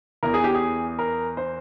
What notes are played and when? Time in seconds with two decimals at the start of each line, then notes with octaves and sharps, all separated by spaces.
0.23 E2 E3 A#4
0.34 G#4
0.44 G4
0.54 G#4
0.99 A#4
1.37 C5